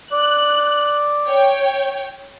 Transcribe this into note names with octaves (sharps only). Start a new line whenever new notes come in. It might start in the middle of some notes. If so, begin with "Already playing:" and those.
D5 F#6
C#5 G5